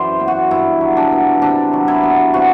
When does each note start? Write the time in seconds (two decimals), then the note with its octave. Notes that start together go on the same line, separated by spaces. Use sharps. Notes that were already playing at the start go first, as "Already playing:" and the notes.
Already playing: F#2 E3 C5 D5
0.20 B3
0.28 F#4
0.51 G2 E4
0.81 F#3
0.97 D4
1.12 B3
1.42 C3 D4
1.73 F#3
1.88 E4
2.03 B3
2.34 C3 F#4